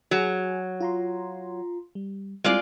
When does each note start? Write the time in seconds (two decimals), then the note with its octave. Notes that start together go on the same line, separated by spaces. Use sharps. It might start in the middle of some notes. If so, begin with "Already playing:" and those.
0.11 F#3 F#4 G#4 G#5
0.81 F4 A#5 C6
1.95 G3
2.44 G3 G#3 C4 E4 F4 D5